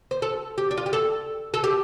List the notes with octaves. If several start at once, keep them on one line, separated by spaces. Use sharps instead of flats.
C5
A4
G4
D4
F4
G4
A4
A4
G4